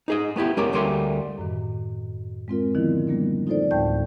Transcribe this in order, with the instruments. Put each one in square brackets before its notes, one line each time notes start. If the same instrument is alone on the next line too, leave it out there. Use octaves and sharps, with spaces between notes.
[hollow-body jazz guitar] D#4 G#4 D#5
A3 B3 E4 G4
G#3 B3 C#4 G4 A#4
D2 G3 A3 A#3 G#5 C6
[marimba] F#2 A2 D#3
G#3 C4 F4 A#4
D3 D#3 F3 B3 E4
G3 A#3 B3 D4
D#4 F4 A4 C5 D5
D2 A2 A3 G5 A5 G6